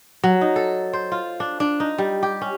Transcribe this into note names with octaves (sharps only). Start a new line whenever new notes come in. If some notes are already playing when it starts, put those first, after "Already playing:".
F#3
D#4
A4
C5
F4
D4
D4
D#4
G3
G4
C#4